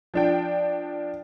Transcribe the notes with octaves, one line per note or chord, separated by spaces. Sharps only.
F3 D4 G5